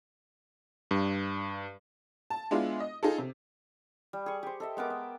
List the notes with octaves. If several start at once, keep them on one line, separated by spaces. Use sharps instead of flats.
G2
A5
G#3 B3 D4 E4 F4
D#5
D#4 F4 G#4 A4
C3
G3
G#4 C#6
G4 C5
A4 D#5 E5
G#3 B3 A#4 D6
G5